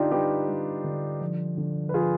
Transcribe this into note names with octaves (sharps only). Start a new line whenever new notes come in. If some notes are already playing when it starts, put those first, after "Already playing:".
Already playing: D3 D4 D#4 F4 G4
G3 G4 B4
G3
D3
F3
D3
B4
F3 F4 G#4